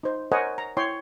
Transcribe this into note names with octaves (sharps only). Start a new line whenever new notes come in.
D#4 C5
A#4 C5 C#5 D#5 F#5 G#5
A#5
E4 C#5 G5 C6